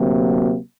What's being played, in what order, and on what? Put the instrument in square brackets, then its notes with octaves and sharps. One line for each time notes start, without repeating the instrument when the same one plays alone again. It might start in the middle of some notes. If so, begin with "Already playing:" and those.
Already playing: [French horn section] D2 C3 F#3 A#3